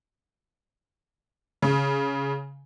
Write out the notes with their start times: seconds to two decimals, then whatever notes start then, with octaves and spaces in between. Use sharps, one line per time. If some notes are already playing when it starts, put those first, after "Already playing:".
1.62 C#3